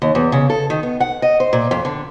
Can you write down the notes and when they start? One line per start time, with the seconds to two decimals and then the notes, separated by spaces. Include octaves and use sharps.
0.02 D#2
0.15 E2
0.32 C#3
0.50 A4
0.70 D#3
0.83 B3
1.00 F#5
1.22 D#5
1.40 C5
1.53 A#2
1.71 F2
1.85 D3